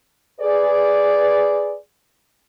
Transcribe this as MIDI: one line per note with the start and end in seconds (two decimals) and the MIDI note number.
0.40 1.74 68
0.40 1.74 71
0.40 1.74 74